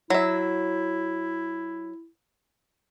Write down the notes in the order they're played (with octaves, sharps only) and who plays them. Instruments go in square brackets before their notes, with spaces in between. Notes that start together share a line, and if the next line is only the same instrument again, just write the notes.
[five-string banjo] F#3 E5 [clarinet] E4